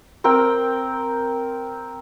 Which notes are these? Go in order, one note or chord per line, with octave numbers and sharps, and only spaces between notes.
C4 A#4 G5